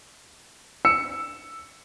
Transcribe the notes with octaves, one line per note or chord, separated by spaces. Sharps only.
E6 C#7